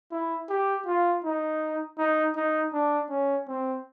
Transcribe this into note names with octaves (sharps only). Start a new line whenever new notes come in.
E4
G4
F4
D#4
D#4
D#4
D4
C#4
C4